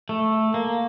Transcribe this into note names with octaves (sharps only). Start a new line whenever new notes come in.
A3
A#3